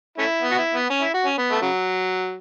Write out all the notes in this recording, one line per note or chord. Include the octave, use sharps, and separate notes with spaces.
A3 C#4 E4
B3
F#4
E4
B3
C#4
E4
F#4
C#4
B3
A3
C#3 F#3